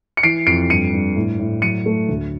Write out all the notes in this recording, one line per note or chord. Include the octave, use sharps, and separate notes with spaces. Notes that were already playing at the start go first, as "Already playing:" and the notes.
C#7
E3 C7 D7
F2 C7 D7
G2 C#7 D#7
G2
A2
A2
F#3 C#7 D#7
A3
D2